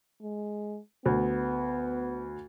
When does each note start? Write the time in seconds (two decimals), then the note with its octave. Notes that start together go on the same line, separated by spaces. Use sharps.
0.22 G#3
1.06 D2 B3